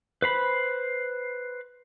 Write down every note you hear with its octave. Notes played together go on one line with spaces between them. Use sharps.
B4 C5 B5